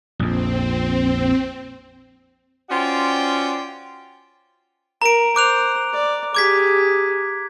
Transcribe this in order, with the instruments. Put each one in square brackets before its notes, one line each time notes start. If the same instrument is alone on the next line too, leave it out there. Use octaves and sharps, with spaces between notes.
[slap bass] A#1 F2 [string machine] C4
[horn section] C#4 F4 F#4 C5 D5 G5
[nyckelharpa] A#4 [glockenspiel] A#5 D7
[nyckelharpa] C5 [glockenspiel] D6 F#6 F7
[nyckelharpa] D5
[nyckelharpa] G4 G#4 [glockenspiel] D6 G#6 B6